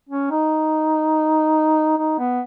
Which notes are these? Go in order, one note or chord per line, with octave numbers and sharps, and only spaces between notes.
C#4
D#4
D#4
B3